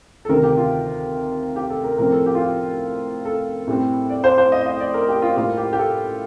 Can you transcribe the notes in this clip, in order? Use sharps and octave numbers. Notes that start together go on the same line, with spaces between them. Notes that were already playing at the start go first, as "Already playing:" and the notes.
A4
D2 C3 D#3 A#4
G4
F4
G4
A4
A#4
A2 F3 C4 A#4
A4
G4
F4
G4
A4
A2 G3 C4
D5
C5
C5
D#5
D#5
D5
A#4
G4
F4
A2 G3 A#3 F4
G4
G4
A4